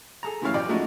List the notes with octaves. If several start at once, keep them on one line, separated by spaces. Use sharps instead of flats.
G#4 A4 A#5
F#2 C#3 E3 A3 C#5 F5
B1 B2 D5 G5 D6
F3 G#3 A3 C#4 D#4 F#4